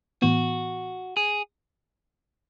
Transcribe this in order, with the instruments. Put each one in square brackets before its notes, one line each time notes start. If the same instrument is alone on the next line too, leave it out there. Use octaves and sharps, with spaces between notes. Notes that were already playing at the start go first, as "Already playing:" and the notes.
[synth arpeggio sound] A2 E3 B3 [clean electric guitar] F#4
[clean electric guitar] G#4